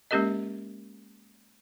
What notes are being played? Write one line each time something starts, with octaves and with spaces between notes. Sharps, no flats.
G#3 A#3 C#4 G4 A#4 D#5